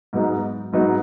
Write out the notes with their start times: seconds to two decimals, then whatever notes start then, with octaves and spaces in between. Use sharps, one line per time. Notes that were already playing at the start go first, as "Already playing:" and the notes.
0.13 G#2 F#3 B3 D#4
0.73 G#2 F#3 B3 D#4